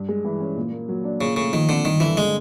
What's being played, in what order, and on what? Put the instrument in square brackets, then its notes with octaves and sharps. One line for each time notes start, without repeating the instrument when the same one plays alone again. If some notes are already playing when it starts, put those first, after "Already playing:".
Already playing: [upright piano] G2
G#3
E3
C#4
A#2
A#3
F#3
D4
[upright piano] A#2 [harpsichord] C#3
[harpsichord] C#3 [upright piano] A3
[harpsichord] D#3 [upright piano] F3
[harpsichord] D3 [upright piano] C4
[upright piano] G1 [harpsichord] D#3
[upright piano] D3 [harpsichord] E3
[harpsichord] G#3